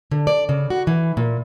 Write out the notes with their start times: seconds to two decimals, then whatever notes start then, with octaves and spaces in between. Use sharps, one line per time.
0.11 D3
0.27 D5
0.49 C#3
0.70 F#4
0.87 E3
1.17 A#2